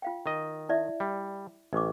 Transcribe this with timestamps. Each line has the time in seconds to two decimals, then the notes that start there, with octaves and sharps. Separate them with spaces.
0.02 F4 F5 G5
0.26 D#3 D#5
0.69 E4 D5 E5
1.00 G3
1.73 A1 D#5 C#6 D6